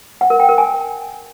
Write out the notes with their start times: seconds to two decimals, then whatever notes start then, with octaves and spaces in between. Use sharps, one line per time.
0.21 F#5
0.30 A#4
0.40 G5
0.49 A#4
0.58 G#5